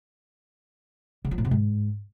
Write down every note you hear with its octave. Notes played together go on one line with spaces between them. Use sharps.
C#3
F3
A2
C3
G#2